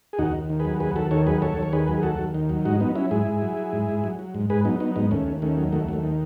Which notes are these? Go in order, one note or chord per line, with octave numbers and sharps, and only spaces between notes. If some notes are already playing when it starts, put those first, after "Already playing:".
G#4
D#2 D#4 F#4
D#2
D#3
G#4 B4
F#3
D#2 G#4 B4
D#2 F#4 A4
D#3 A4 C#5
F#3 G#4 B4
D#2 A4 C#5
D#2
C#5
D#3 G#4 B4
F#3
G#4
D#2 F#4 A4
D#2
D#3
F#3
G#2 D#4 F#4
F#3 B3 D#4
F#3 C#4 E4
G#2 E4 G#4
G#2
F#3
F#3
G#2
G#2
F#3
F#3
G#2
G#2 G#4 B4
F#3 B3 D#4
F#3 B3 D#4
G#2 B3 D#4
D#2 A3 C#4
D#2
D#3 A3 C#4
F#3
D#2 A3
D#2 A3
D#3